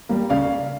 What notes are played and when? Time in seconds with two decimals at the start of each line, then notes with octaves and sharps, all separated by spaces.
0.09 G3 A#3
0.30 C#3 D5 F5